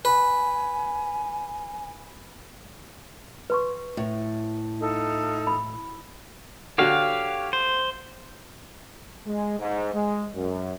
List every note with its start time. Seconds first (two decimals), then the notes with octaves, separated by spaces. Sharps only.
0.05 B4 G#5
3.50 B4 C6 C#6
3.97 A2
4.80 D#4 F4 A4
5.47 B5
6.78 D3 F#4 G4 C#5 F5
7.53 C5
9.27 G#3
9.60 G#2
9.94 G#3
10.34 F#2